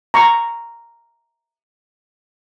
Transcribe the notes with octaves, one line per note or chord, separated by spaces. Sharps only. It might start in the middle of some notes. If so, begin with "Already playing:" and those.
A#5 C#6